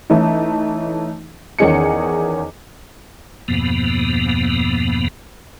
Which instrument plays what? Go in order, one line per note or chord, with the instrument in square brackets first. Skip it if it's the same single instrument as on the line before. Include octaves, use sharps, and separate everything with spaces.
[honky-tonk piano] E3 A3 C#4 D#4
E2 D#3 C#4 G#4 D#5 C#7
[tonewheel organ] E2 G2 B2 F3 A#3 B3